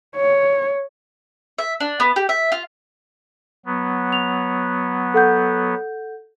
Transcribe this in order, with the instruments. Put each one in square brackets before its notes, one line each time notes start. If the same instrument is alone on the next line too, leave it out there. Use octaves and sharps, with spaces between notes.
[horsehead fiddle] C#5
[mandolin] E5
D4
B3
G4
E5
F4
[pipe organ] F#3 B3
[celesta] F7
A4 F#5 G6